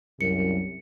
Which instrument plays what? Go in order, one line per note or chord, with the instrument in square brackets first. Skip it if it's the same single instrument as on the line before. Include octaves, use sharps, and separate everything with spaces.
[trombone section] C2 F#2 [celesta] C#7